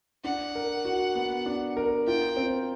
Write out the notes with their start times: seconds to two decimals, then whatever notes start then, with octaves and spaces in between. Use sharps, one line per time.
0.24 D4 F#5
0.55 A#4
0.85 F#4
1.15 B3
1.46 D4
1.77 A#4
2.07 F4 G5
2.37 C4